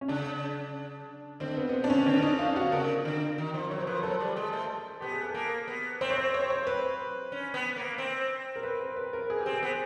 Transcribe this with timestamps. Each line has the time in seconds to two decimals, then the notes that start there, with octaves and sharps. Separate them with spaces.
0.01 C#4
0.08 C#3 D4
1.40 D3 C4
1.57 B3
1.69 B3
1.73 C4
1.84 D4
1.90 C#4
2.06 D3 C#4
2.22 D#4
2.39 F4
2.56 F#4
2.72 C#3 A#4
3.05 D3
3.38 D#3
3.54 F3
3.70 F#3 C#5
3.78 C5
3.87 F3 B4
3.96 A#4
4.03 F#3 A4
4.20 G3
4.36 G#3
4.53 A3
5.01 B3 G4
5.12 G#4
5.23 A4
5.34 A#3 A#4
5.68 B3
6.01 C4 C5
6.10 C#5
6.17 C5
6.34 C#5
6.50 C5
6.67 B4
7.32 C#4
7.54 B3
7.76 A#3
7.98 C4
8.56 A#4
8.63 B4
8.80 A#4
8.96 B4
9.13 A#4
9.30 G#4
9.41 G4
9.46 C4
9.52 G#4
9.63 B3